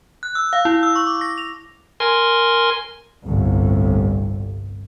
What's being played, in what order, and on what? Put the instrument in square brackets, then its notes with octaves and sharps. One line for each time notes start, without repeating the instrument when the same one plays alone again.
[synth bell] F#6
E6
F5
E4
E6
C#6
D6
A#6
F7
[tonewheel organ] A#4 G#5 C6
[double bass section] G1 C2 A2